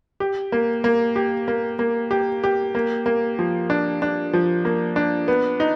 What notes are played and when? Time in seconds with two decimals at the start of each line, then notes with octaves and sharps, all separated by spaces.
0.20 G4
0.52 A#3
0.84 A#3
1.16 G4
1.48 A#3
1.79 A#3
2.11 G4
2.44 G4
2.75 A#3
3.06 A#3
3.39 F3
3.70 D4
4.02 D4
4.33 F3
4.65 A#3
4.96 D4
5.28 B3
5.60 D#4